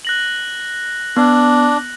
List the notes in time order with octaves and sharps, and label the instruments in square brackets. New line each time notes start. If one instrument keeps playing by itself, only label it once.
[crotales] F#6 A#6 F#7
[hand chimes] B3 [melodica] D4